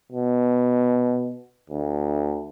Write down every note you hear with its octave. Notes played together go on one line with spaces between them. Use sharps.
B2
D2